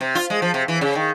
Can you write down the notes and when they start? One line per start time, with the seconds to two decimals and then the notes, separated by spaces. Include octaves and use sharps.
0.01 C3
0.15 F4
0.30 G#3
0.42 F3
0.54 C3
0.68 E3
0.81 C#3
0.95 D#3